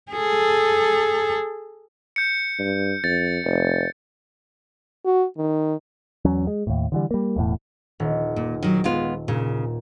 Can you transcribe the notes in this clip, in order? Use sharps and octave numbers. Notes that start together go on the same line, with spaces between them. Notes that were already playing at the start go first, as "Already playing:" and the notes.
G#4 A4
G6 C#7
G2
F2 A6
F1
F#4
D#3
E2 F#3 C#4
G#3
D#2 A2
D3 E3 G3
G3 A#3
E1 E2 A2
D#1
A#2
D#3 F#3
G#3 B3 F4
A#2 C#3